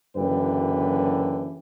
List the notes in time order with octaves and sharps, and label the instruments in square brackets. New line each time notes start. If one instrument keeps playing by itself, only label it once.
[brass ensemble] F#1 F#2 D3 E3 B4 G5